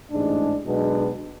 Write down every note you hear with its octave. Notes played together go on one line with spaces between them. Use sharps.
A1 G#2 G#3 D4
B1 B2 G#3 B3 D4